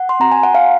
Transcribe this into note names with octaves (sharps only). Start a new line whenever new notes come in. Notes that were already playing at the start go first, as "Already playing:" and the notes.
Already playing: F#5
C6
C4 F#4 A#5
G#5
F#5
F5